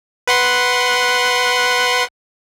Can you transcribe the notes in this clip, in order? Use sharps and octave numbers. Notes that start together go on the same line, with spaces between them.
B4 F#5 C6